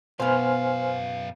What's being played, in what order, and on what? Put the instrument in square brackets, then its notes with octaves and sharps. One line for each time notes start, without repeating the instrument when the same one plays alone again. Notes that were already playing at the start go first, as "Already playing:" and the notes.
[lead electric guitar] F#2 F5 [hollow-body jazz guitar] B2 B3 [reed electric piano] C5 G#5 F6